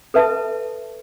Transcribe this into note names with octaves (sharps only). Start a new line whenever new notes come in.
A4 B4 E5 A5